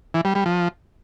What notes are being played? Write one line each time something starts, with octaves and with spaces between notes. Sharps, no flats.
E3
G3
G3
F3